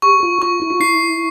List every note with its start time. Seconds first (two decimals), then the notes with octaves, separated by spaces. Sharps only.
0.02 G4 C#6
0.23 F4
0.42 F4 C#6
0.62 E4
0.70 F4
0.80 E4 C7